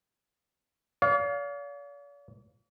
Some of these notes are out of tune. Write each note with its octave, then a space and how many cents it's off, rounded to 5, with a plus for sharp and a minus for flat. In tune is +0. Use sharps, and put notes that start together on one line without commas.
D5 -45 F5 +15